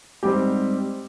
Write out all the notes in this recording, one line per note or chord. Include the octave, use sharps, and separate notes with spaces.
G#2 G3 C4 G4